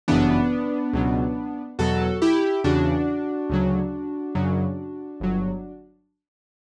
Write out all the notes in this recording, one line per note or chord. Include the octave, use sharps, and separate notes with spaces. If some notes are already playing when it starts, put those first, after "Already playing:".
G1 F#2 C#3 E3 B3 D4
C#2 B2 F#3
E2 B2 F#3 F#4 A4
E4 G4
E2 C#3 E3 D4 F#4
D2 C#3 F#3
F#2 C#3 F#3
G1 F#3